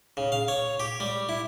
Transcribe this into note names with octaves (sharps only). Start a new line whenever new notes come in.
C#3
F5
C#5
G4
G3
E4